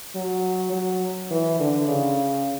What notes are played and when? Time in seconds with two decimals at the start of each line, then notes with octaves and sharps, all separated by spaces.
0.15 F#3
0.73 F#3
1.31 E3
1.60 D3
1.88 C#3